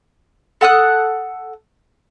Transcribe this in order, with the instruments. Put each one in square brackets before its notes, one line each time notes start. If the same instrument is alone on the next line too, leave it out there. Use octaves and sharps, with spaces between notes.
[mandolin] A4 F#5 D#6 F#6